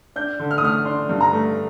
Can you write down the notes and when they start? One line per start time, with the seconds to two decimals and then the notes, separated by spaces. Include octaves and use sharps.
0.16 D4 G6
0.40 D3
0.51 F6
0.58 D#6
0.62 A3 F6
0.85 D4 C6
1.09 G2
1.21 A#5
1.33 A3